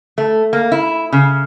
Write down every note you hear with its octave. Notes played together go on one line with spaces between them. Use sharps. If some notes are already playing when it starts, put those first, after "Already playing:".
A3
A#3
E4
C#3